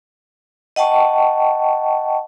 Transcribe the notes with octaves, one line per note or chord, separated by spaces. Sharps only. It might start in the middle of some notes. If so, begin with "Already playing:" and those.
D#5 F#5 G5 A5 C#6